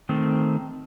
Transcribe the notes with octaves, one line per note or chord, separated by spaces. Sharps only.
D#3 A3 C4